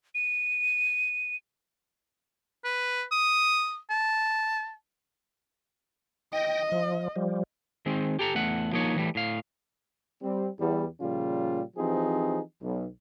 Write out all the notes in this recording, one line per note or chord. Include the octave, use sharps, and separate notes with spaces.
D#7
B4
D#6
A5
D#5 G5 A#6
F3
F3 G3
D#3 G#3 C4
G4 A4 A#5
E2 A3 F#5
F3 A#3 D#4 C#5
E3 G3 A3
A2 F5
G3 C4
E2 G3
A#2 C#3 F3 G3 C#4 F4
E3 F3 C4 D#4 G4 G#4
B1